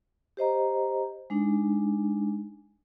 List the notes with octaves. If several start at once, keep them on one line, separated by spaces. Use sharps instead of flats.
G4 C5 D#5 A#5
G#3 D4 D#4